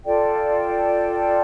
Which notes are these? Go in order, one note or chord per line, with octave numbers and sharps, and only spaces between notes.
F4 A4 D5 G5